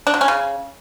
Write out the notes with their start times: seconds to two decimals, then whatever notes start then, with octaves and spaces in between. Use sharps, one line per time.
0.07 D4
0.14 F#3
0.21 C#4
0.28 C#3